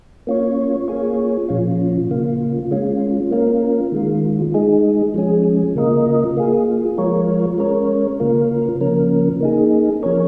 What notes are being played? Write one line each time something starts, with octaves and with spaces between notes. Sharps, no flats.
A#3 C#4 F4 C#5
A#3 F4 G#4 C#5
A#2 F3 C#4 F4
C#3 A#3 F4
G#3 C#4 F4
A#3 C#4 F4 A#4
D#3 G#3 F4
G#3 D#4 G#4
F3 G#3 C#4 G#4
C#3 A#3 F4 A#4 D#5
A#3 F4 G#4
F3 G#3 F4 A#4 C#5
G#3 C#4 A#4 C#5
C#3 A#3 F4 A#4
C#3 F3 A#3 C#4 A#4
A#3 D#4 G#4
F3 C#4 A#4 C#5